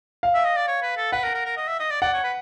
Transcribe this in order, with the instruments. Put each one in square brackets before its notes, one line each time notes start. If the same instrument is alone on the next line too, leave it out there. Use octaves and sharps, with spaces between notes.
[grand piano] F5
[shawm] E5
D#5
D5
C#5
B4
A4
[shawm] B4 [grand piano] F#5
[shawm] A#4
A#4
A#4
D#5
E5
D#5
D5
[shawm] D5 [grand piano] F#5
[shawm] C#5
B4